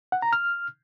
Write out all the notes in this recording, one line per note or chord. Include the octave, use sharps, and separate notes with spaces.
F#5
A#5
F6